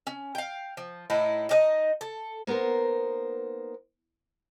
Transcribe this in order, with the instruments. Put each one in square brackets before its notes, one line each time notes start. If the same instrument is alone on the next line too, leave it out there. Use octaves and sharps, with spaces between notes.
[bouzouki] C#4
F5 G5
F3
A2 D#4 E4
D#4 G4 D#5
A4
[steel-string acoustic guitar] A#3 B3 D#4 A#4 C5